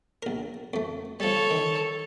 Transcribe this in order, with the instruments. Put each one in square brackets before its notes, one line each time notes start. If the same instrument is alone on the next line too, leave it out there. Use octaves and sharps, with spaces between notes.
[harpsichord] A#1 A#4
F2 A3
[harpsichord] F3 G3 [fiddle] A4 C#5
[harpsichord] D#3